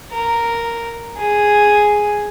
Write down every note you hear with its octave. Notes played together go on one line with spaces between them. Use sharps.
A#4
G#4